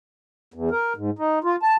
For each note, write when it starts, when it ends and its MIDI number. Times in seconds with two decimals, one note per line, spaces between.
0.54 0.70 40
0.71 0.93 70
0.97 1.10 44
1.19 1.39 63
1.44 1.56 65
1.62 1.77 81